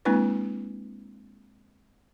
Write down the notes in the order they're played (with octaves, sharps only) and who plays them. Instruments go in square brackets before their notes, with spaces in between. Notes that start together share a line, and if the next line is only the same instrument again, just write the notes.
[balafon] G#3 A#3 C4 D4 E4 B4